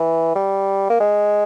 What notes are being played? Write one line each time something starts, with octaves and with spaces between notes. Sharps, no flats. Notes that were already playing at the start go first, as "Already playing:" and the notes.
Already playing: E3
G3
A#3
G#3